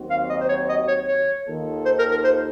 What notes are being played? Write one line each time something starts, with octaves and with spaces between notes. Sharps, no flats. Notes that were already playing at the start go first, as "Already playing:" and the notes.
Already playing: D#2 D#3 F#3 C4 F#4
F5
D#5
C5
C#5
D#5
C#5
C#5
D#2 D#3 A#3 F4 A4
C5
A#4
A#4
C5